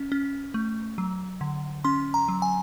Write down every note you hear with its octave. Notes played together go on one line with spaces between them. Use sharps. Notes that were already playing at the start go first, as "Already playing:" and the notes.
Already playing: C#4
C#4
A3
F#3
D3
C#4 C6
A#5
F#3
G#5